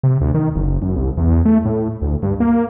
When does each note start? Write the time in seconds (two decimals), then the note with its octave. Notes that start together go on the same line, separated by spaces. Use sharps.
0.03 C3
0.21 D2
0.34 D#3
0.55 F#1
0.82 F#2
0.96 C2
1.17 E2
1.45 A3
1.65 A2
2.02 D2
2.23 G2
2.40 A#3